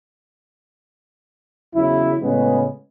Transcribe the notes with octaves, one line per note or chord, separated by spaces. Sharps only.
E2 C#3 F#3 E4
A2 C#3 G#3 B3 C#4 B4